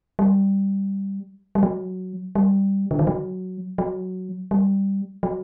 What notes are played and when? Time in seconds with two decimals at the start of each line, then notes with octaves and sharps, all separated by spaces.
0.19 G3
1.55 G3
1.63 F#3
2.35 G3
2.91 D3
2.99 D#3
3.07 F#3
3.78 F#3
4.51 G3
5.23 F#3